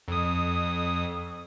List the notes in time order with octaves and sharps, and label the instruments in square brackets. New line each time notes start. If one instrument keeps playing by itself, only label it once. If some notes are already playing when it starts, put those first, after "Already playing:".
[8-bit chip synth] F2 D#6